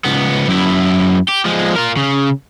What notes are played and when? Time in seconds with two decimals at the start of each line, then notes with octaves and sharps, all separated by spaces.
0.05 C#2 B3
0.48 F#2 E4
1.29 G4
1.46 F3 G#3
1.76 F4 A#4
1.97 C#3